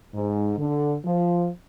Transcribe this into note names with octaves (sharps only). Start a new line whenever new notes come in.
G#2
D3
F3